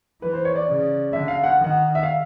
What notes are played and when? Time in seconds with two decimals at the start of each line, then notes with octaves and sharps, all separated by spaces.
0.22 E3 B4
0.33 C5
0.45 C#5
0.56 D5
0.68 C#3
1.13 D3 E5
1.28 F5
1.44 F#5
1.58 D#3
1.64 F#5
1.95 E5
2.03 F5